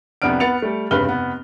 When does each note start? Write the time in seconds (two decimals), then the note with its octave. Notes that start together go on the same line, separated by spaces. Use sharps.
0.22 C2 F2 B3 D4 F6 D7
0.40 B3 B4 A6 C#7 F7
0.62 G3 A3
0.91 F1 G2 C#3 B4 F6 G7
1.06 F1 B3